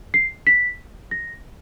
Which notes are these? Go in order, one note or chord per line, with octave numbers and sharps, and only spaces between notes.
C7
B6
A#6